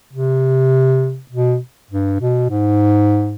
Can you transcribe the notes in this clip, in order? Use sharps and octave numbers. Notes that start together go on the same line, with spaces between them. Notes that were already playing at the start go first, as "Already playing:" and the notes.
C3
B2
G2
B2
G#2